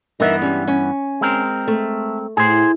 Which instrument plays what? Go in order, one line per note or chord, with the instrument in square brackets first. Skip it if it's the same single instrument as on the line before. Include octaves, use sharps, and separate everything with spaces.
[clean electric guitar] G2 E3 B3 [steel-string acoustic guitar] D#4 A#4 E5
[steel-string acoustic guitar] G3 G#3 C#4
C#4
[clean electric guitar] G#3 C4 A#4
[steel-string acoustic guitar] A3
[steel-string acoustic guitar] A2 [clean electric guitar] G#4 C5